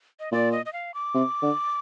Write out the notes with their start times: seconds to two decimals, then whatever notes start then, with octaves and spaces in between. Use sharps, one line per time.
0.20 D#5
0.32 A#2 D5
0.52 D#5
0.66 D#5
0.73 F5
0.94 D6
1.14 C3
1.42 D3